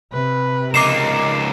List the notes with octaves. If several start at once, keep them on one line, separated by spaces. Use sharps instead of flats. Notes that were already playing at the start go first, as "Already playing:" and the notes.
C3 B4
C#2 D#4 A#4 D6 C7 E7